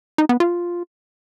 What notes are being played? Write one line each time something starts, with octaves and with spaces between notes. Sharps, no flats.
D#4
B3
F4